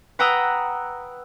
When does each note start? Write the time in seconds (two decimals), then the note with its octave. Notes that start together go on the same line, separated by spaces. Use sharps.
0.19 B4 F#5 G5 A#5 D#6 E6